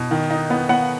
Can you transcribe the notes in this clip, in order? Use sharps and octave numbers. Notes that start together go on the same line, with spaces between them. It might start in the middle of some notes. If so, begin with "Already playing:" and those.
Already playing: B2
D#3
D#4
B3
B3 F#5